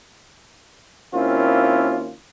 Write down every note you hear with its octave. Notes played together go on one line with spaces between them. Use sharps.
D#2 A#3 C4 C#4 E4 F4